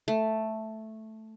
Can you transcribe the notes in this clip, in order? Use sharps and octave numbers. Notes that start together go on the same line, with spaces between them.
A3